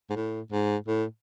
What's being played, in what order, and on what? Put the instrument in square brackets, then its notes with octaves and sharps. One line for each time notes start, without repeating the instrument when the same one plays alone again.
[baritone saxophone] G#2
A2
G#2
A2